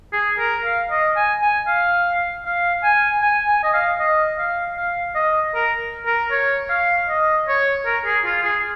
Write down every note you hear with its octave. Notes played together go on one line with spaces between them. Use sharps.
G#4
A#4
F5
D#5
G#5
G#5
F5
F5
G#5
G#5
G#5
D#5
F5
D#5
F5
F5
D#5
A#4
A#4
C#5
F5
D#5
C#5
A#4
G#4
F4
G#4